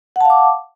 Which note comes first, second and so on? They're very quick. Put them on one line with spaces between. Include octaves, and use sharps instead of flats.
F#5 A5 F5 D6